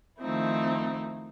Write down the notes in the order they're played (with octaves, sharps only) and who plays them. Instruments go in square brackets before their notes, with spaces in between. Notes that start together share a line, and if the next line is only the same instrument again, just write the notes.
[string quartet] D#3 F3 A3 C4 D#4 E4